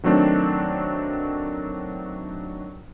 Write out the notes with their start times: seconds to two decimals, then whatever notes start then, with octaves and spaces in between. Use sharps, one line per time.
0.03 D#3 F#3 A3 C4 D4